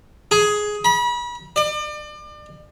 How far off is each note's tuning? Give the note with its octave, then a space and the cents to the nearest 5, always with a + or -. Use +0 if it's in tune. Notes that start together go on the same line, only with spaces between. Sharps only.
G#4 +10
B5 -35
D5 +35